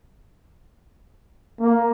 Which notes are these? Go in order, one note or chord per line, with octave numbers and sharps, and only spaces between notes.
A#3